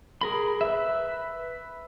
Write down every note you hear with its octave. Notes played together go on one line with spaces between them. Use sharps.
G#4 A#4 B5
B4 E5